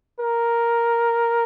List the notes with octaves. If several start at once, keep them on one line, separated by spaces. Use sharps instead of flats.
A#4